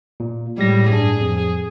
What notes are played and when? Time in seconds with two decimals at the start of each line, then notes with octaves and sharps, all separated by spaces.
0.20 A#2
0.58 A2 G3 G#3 A#6
0.90 G2 D4 G#4
1.21 F2